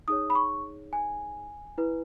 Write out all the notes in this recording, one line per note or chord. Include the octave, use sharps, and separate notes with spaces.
D#4 G#4 C#5 D#6
B5
C#6
G#5
E4 B4